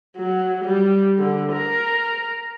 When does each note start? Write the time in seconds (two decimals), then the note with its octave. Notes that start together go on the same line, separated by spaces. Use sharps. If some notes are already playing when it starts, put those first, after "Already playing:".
0.16 F#3
0.64 G3
1.19 D3
1.52 A#4